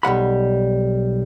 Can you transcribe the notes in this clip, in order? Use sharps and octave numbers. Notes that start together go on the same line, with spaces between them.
B1 G3 F#5 B5